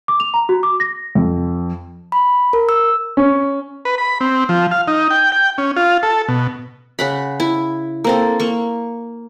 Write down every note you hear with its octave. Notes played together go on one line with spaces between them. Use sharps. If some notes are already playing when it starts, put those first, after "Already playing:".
D6
F7
A#5
F#4
D6
A#6
F2
B5
A#4
E6
C#4
B4
B5
C4
F3
F5
D#4
G5
G5
C#4
F4
A4
B2
C#3 F#5 B5
E4
A#3 C4 A4
A#3 C#6